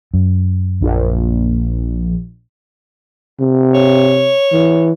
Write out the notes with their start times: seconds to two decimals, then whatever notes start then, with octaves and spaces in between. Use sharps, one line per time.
0.14 F#2
0.81 A#1
3.40 C3
3.74 C#5
4.53 E3